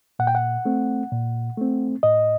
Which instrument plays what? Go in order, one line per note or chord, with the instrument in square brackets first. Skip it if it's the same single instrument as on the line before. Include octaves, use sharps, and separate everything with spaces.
[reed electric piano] A#2 F#5
G5
F#5
A3 C4
A#2
A3 C4
A2 D#5